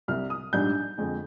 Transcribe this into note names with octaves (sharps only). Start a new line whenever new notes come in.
C2 C3 G3 F6
D#6
A#1 G#2 G3 D4 G6
F2 D3 G#3